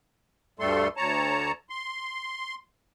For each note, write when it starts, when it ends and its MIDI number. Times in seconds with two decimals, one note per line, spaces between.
0.59 0.88 38
0.59 0.88 43
0.59 0.88 55
0.59 0.88 57
0.59 0.88 69
0.59 0.88 84
0.97 1.52 38
0.97 1.52 73
0.97 1.52 81
0.97 1.52 82
1.70 2.55 84